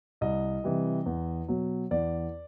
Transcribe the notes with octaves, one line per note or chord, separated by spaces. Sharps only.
C2 D#5
C3 E3 G3
E2
B2 F#3
E2 D5